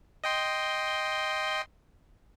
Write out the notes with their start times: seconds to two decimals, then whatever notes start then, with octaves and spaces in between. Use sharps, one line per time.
0.24 D#5 G5 C6